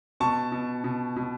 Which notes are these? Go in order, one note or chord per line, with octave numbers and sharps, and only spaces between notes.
B2 A5 C#6
B2
B2
B2